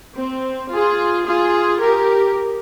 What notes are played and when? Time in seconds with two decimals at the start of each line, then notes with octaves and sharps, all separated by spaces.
0.17 C4
0.72 F4 G#4
1.27 F4 G#4
1.82 G4 A#4